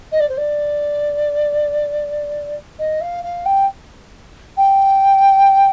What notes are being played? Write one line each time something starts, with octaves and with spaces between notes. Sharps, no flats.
D#5
D5
C5
D5
D#5
F5
F5
G5
G5